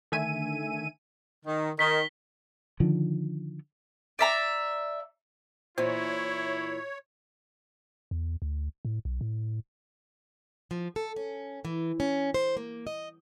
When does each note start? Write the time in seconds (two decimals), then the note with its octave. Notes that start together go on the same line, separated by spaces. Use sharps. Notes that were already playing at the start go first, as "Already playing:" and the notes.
0.12 D3 D#3 A3 E5 G#5 D#7
1.45 D#3
1.79 D#3 B6 G7
2.80 D3 D#3 F3
4.19 D5 E5 A#5
5.78 A#2 E3 E4 C5 C#5
8.11 E2
8.42 D2
8.85 A2
9.05 B1
9.21 A2
10.71 F3
10.96 A4
11.16 C#4
11.65 E3
12.00 C#4
12.34 C5
12.57 A#3
12.87 D#5